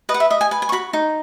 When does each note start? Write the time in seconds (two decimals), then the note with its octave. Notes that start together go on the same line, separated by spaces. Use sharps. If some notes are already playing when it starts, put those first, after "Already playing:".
0.09 B4 D#5
0.14 F#5
0.20 E5
0.30 D#5 E5
0.41 G#5
0.51 B4 G#5
0.62 G#5
0.69 C#6
0.72 F#4 B5
0.93 D#4